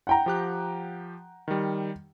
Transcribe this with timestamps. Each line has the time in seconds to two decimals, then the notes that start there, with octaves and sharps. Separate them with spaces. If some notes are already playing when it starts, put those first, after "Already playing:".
0.07 F#5 G5 A#5
0.26 F3 G4 F#6
1.48 D#3 G3